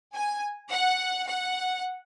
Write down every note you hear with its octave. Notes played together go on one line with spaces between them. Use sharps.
G#5
F#5
F#5